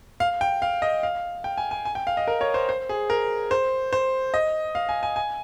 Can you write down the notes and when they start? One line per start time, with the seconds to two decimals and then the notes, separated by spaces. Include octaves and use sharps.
0.20 F5
0.41 G5
0.62 F5
0.82 D#5
1.03 F5
1.44 G5
1.57 G#5
1.71 G#5
1.85 G#5
1.95 G5
2.07 F5
2.17 D#5
2.27 A#4
2.41 C#5
2.54 C5
2.69 C5
2.89 G#4
3.10 A#4
3.51 C5
3.93 C5
4.34 D#5
4.75 F5
4.89 G#5
5.03 G#5
5.16 G#5